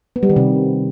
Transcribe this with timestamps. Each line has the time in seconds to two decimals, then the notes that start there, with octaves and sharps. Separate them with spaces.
0.16 B3
0.23 G3
0.30 D#3
0.36 C3